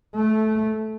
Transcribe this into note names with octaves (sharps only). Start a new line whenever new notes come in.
A3